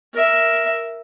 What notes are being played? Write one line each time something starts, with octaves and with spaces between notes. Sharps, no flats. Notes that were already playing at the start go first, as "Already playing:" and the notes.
A#4 E5